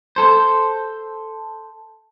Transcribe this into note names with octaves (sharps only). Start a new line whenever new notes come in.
A4 C5